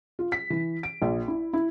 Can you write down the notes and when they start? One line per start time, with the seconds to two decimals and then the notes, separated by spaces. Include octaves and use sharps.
0.19 F4
0.32 B6
0.50 E3
0.83 D7
1.02 A#1
1.28 E4
1.53 E4